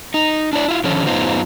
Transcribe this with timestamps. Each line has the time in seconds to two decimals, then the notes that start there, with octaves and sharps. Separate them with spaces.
0.14 D#4
0.53 D4 E4 D5
0.68 E4 F4
0.84 D3 D#3 F3 C#4 F4
1.07 F#2 A2 B3 D#4 F4 C5